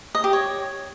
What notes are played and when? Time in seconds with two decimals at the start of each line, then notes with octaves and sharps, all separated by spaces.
0.15 D#5
0.24 G4
0.33 C#5